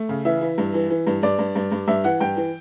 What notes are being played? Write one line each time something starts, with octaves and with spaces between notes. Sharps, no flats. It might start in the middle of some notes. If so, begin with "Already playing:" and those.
Already playing: A3
C#3
E3 E5
E3
G2
E3
E3
G2
G2 D5
G2
G2
G2
G2 E5
E3 F#5
G2 G5
E3